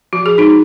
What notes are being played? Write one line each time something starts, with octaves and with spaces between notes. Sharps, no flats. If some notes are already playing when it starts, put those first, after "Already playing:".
F3 F#4
G#4
D#4 F#4